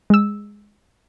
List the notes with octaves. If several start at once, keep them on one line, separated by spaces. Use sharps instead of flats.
G#3 E6